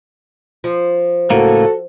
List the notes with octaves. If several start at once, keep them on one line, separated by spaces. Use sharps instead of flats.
F3
C#2 A2 A#3 F#4 A4